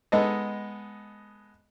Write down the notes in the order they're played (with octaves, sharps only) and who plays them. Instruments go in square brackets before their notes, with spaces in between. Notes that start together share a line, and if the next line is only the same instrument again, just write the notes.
[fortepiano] G#3 B3 D#4 A4 D#5